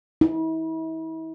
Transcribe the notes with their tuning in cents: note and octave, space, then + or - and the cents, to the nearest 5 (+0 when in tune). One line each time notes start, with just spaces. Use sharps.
E4 -40